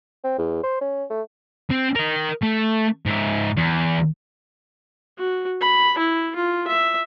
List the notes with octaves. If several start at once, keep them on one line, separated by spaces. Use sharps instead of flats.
C4
E2
C5
C#4
A3
C4
A#4 D#5
A3
G#2 E5
E2
F#4
B5
E4
F4
E5